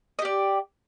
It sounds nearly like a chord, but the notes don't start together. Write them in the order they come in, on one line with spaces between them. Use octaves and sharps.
D#5 G4 D5